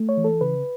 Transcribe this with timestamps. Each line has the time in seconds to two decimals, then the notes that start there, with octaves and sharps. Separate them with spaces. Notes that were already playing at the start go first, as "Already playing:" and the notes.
Already playing: A3
0.09 C#5
0.17 E3
0.24 A4
0.41 C#3 B4